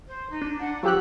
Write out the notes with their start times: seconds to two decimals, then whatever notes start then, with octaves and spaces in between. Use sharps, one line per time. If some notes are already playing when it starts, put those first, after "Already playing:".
0.07 C5
0.30 D#4
0.41 D4
0.60 F#5
0.83 F3 F#3 G4 E6 F#6